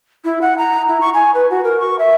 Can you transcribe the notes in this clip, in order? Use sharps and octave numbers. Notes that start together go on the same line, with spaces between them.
E4
F#5
A#5
E4
C#6
G#5
B4
F#4
A#4
C#6
E5